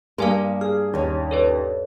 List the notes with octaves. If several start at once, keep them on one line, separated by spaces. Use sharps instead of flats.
G2 A#3 A#4 F5 G#5 C6 D#6
G#4 F6
D#2 C#4 D#4
A4 B4 C#5